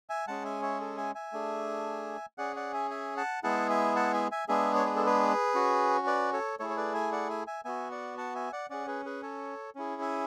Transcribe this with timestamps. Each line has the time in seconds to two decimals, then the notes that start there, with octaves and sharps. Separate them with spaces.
0.10 E5 G#5
0.28 G#3 C#4 G#4 F#5 A5
0.45 E5 G#5
0.62 C#5 E5
0.81 A4
0.98 E5 G#5
1.15 E5 G#5
1.33 A3 D4 G#4
2.38 C#4 G#4 D5 F#5
2.56 D5 F#5
2.74 E5 G#5
2.91 E5 G#5
3.17 F#5 A5
3.43 G#3 B3 E4 G#4 F#5 A5
3.70 E5 G#5
3.96 F#5 A5
4.14 E5 G#5
4.31 E5 G#5
4.48 G#3 B3 D4 G#4 E5 G#5
4.75 C#5
4.85 B4
4.96 A4
5.06 G#4 B4
5.54 C#4 F#4
6.07 B4 D5
6.33 A4 C#5
6.59 A3 E4 G#4 A4 C#5
6.70 C#5
6.77 B4 D5
6.94 E5 G#5
7.12 D5 F#5
7.30 E5 G#5
7.47 E5 G#5
7.65 B3 F#4 E5 G#5
7.91 D5 F#5
8.18 F#5 A5
8.35 E5 G#5
8.52 D5 F#5
8.70 C#4 G#4 D5 F#5
8.87 G#4 B4
9.06 G#4 B4
9.23 A4 C#5
9.75 C#4 E4 G#4
10.02 E5 G#5